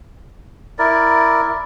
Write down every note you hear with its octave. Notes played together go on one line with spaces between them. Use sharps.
E4 A#4 D5